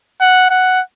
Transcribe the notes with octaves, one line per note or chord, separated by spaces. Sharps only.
F#5
F#5